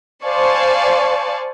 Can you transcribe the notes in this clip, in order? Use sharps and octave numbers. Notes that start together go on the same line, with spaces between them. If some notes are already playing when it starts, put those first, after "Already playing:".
C5 D5 F5 G#5 A5 C#6